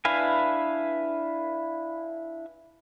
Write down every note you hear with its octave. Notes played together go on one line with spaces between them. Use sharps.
D4 E4 B4 F5 G#5